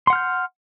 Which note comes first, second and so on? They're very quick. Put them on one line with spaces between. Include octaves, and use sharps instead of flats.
C6 F#5 F6 G6